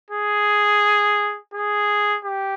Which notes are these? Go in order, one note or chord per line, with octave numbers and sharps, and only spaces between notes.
G#4
G#4
G4